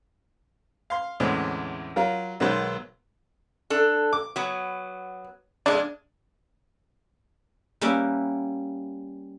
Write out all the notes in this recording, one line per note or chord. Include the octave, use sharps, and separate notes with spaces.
F5 C6
E2 A2 D3 G#3 C4 C#4
F#3 F4 A#4
B1 D#3 F#3 G#3 B4 C5
D4 A4
D6
F#3 B3
F2 G#3 D4
G3 A#3 C#4 G4 B4 E5